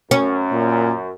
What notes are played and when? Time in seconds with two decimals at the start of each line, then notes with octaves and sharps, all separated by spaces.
0.11 F#2 C#4
0.52 A#2